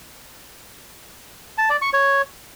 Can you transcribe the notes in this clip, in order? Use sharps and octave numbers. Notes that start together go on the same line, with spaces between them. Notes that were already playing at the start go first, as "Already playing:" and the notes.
A5
D5
C#6
C#5